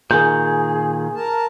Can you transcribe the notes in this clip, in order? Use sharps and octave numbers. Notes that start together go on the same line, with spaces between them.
A#2 D#3 G#4 G6
A#4 A5